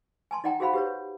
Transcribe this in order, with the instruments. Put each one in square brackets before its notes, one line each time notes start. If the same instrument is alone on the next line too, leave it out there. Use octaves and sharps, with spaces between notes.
[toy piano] G#5 A5 C6
D#4 D5 F#5 G5 A#5
F#4 G#4 C5 F5 F#5 B5
G4 B4 C#5